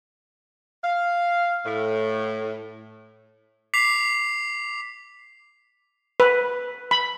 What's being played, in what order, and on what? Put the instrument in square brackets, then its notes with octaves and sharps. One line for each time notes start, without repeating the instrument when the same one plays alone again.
[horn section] F5
A2
[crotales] D6 B6 C7 F7
[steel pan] B4
B5